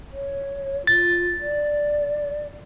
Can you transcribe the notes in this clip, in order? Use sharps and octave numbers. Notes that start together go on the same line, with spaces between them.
C#5
F4 A6
D5